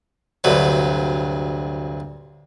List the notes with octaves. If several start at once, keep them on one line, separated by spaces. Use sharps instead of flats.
D2 G2 C3 F#3 B4